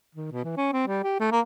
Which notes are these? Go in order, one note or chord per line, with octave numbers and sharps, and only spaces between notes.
D#3
B2
E3
C#4
C4
G3
G4
A3
A#3